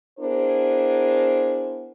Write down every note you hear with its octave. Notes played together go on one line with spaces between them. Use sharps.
B3 D4 E4 G#4 A#4 C5